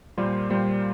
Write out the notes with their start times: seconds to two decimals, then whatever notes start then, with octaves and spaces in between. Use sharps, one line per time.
0.17 A#2 G3 A#3 F4 C5
0.50 A#2 G3 A#3 F4 C5